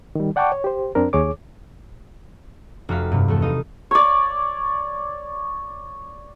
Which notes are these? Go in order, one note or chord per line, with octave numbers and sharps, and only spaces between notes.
D#3 G3
D5 F#5 G5 A5 C#6 D6
C#5
G4 C5
F#2 C4 D4 A#4
D#2 G#4 C#5 D6
F1 F#4 F5 B6
G2 C3 F#3
E2 A3 A4
D#4 F5 D#6
C#5 D5